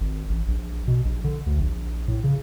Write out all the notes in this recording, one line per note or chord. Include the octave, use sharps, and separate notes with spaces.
G#1
A1
A#1
B2
A#1
D3
D2
A#1
A2
C#3